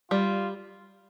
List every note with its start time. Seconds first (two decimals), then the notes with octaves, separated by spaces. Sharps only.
0.11 G3 F4